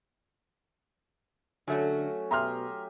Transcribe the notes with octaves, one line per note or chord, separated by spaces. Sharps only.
D3 F#3 A3 C#4 F#4
B2 G4 E5 A#5 C6 D#6 F6